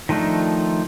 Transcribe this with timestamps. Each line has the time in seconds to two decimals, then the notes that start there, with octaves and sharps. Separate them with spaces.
0.09 D#3 F3 A3 D4 D#4